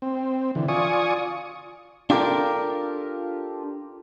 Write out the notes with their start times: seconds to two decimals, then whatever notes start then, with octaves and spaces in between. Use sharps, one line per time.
0.02 C4
0.55 D3 E3
0.68 F4 D5 G#5 C#6 D#6
2.10 D4 F4 G4 A4 A#4